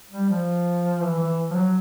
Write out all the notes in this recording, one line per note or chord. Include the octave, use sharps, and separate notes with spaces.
G3
F3
E3
E3
F3
F#3